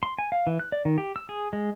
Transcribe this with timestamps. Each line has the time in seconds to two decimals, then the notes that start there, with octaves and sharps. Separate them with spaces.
0.03 C6
0.19 G#5
0.32 F5
0.47 E3
0.59 F#6
0.72 D5
0.85 D#3
0.98 G4
1.16 E6
1.29 G#4
1.53 G#3